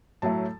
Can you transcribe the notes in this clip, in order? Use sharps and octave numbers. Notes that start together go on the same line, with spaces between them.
A2 F#3 A3 A5